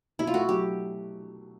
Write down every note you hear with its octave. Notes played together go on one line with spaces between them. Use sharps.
B2 E4
F4
A3 F#4
F#3 G4